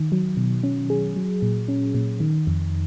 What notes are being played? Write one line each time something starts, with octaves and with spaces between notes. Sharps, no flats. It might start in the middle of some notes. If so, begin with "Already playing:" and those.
Already playing: D#3
F#3
B2
C#4
G#4
F#3
A#2
C#4
A#2
D#3
F2